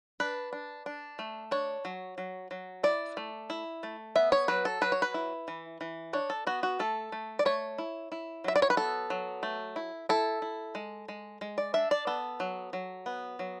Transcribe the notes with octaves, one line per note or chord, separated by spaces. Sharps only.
D4 B4
D4
D4
A3
D4 C#5
F#3
F#3
F#3
E4 D5
A3
E4
A3
B3 E5
C#5
F#3 B4
A4
F#3 B4
C#5
B4
E4
E3
E3
D4 C#5
A4
B3 F#4
F#4
A3 A4
A3
D5
A3 C#5
E4
E4
F#3 E5
D5
C#5
B4
B3 A4
F#3
A3
E4
E4 A4
E4
G#3
G#3
G#3
D5
D4 E5
D5
B3 A4
F#3
F#3
B3
F#3